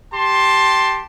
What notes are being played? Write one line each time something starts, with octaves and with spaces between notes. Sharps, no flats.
G4 A5 C6